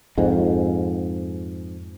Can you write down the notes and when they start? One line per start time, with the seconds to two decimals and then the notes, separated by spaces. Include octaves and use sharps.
0.18 F2 G#2